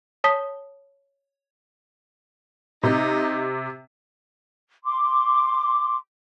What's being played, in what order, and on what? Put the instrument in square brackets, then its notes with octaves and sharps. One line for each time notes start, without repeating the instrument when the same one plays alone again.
[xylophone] C#5 A5 D#6 B6 G7
[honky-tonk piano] C3 [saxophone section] D#4
[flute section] C6 D6